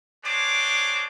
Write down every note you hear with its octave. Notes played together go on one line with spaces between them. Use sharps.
G#3 C4 D4 C#5 C6 D6